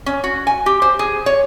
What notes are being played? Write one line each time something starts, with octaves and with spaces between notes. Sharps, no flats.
C#4
F#4
G#5
G4
C5
G#4
C#5